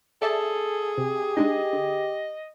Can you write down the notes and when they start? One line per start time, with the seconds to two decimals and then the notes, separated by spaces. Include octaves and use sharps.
0.22 G#4 A4 D5 E5 A5
0.98 C3 G4
1.37 G#3 D4 D#4 D#5
1.73 D3